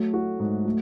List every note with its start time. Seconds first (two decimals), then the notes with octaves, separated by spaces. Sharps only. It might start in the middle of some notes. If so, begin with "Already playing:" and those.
Already playing: F#3 A3
0.14 F#4
0.40 G#2
0.65 F#3 A3